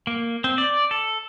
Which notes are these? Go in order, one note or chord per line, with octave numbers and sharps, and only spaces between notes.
A#3
C4
D5
A4